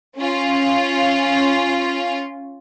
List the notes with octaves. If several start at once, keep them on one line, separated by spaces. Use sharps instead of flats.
C#4 F4